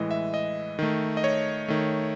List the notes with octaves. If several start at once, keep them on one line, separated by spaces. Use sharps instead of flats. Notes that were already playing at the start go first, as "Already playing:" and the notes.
Already playing: A2 E3 G#3 D#5
E5
D#5
D#3 A3
D#5
C#5
D#3 A3